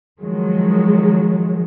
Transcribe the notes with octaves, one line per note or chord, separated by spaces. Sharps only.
D#3 F3 F#3 G#3